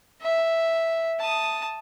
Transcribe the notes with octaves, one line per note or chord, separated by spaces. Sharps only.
E5
A5 D#6